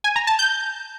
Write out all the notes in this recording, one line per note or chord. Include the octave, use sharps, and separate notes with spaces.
G#5
A#5
A5
G6